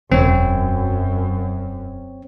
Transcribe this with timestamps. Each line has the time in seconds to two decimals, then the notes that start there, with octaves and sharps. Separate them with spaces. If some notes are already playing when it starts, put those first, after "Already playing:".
0.12 E1 F#2 C4 C#5